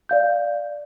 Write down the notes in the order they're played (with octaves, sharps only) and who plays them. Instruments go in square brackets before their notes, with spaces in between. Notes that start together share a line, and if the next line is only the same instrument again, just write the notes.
[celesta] D5 F5 G6